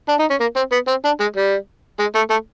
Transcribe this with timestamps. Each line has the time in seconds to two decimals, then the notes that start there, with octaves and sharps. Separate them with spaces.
0.08 D4
0.19 D#4
0.30 C#4
0.40 A#3
0.56 C4
0.72 B3
0.87 C4
1.04 D4
1.20 G#3
1.36 G3
1.99 G#3
2.15 A3
2.30 A3